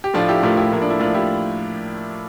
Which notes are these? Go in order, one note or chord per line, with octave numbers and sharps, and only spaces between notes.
G4
A2 F3 A3 D4 F4
E4 G4
A2 F3 A3 G4 A#4
E4 G4
A2 F3 A#3 E4
D4
E4
A2 F3 A#3 D4 F4
E4 G4